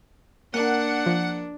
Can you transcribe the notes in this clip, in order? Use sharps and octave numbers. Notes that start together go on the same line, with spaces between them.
A#3 D4 F#5
F3